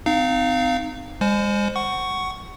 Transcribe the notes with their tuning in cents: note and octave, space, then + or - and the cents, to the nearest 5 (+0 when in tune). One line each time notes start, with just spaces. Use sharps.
C4 -35 D#4 -20 F5 -5
G#3 -40 C5 +0 G#5 +30
F#5 +15 C#6 +0